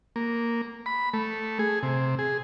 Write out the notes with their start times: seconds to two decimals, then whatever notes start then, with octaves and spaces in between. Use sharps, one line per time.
0.16 A#3
0.86 B5
1.14 A3
1.59 G#4
1.83 C3
2.19 G#4